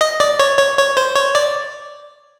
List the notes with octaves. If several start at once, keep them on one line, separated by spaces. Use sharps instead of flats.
D#5
D5
C#5
C#5
C#5
C5
C#5
D5